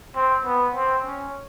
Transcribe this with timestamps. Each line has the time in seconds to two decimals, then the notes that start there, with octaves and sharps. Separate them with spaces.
0.15 C4
0.45 B3
0.75 C4
1.05 C#4